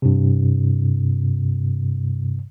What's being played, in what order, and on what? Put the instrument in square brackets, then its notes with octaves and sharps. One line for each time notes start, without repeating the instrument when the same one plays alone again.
[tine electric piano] G2 C3